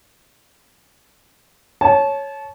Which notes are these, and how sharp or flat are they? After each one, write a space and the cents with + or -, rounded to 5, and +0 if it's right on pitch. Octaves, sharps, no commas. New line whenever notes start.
C#5 +0 A5 -25